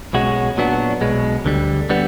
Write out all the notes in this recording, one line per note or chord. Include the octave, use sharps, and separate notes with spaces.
B1 B2 G#3 C#4 F#4
A#2 F#3 B3 D4 F#4
B1 B2 G#3
D2 D3 G3
D3 G3 B3